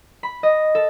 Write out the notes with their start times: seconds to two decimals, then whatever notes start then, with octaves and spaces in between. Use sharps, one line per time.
0.23 B5
0.43 D#5
0.75 A4